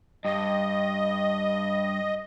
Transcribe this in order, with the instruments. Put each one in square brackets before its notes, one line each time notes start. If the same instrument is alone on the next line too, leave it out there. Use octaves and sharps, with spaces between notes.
[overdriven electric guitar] G2 [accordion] D#5